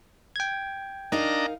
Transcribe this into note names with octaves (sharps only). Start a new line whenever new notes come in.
G5 G#6
D4 D#4 A#4 D#5 F5 A#5